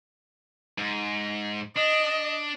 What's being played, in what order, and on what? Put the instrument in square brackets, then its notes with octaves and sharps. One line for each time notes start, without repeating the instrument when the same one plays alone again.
[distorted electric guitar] G#2
[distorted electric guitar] D4 [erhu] D#5